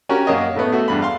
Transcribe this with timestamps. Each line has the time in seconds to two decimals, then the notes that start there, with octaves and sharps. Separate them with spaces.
0.09 C#4 F#4 G4 A#4
0.27 F#2 A#3 C#5 D#5
0.56 A2 A3 B3
0.72 A3 F#4 E5
0.88 E2 G2 B5
1.02 F5 C6